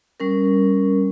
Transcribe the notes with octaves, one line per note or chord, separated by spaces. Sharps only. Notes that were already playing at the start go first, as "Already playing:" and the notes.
G3 C#4 A#4